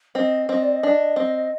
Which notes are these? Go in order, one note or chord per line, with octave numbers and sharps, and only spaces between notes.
C4 D#5
C4 D#5
D5
D#5
D4
C4